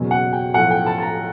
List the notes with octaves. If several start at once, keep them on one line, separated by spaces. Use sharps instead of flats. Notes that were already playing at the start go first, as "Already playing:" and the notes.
Already playing: F#1 E2 B2 F#3
F#5
G5
B1 A2 F3 F#5
G5
A5
A5
A#5